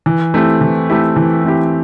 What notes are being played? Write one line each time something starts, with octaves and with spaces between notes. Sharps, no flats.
E3
A3 C4 E4 G4
E3
A3 C4 E4 G4
E3
A3 C4 E4 G4